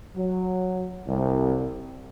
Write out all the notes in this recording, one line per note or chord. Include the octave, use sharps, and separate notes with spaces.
F#3
C2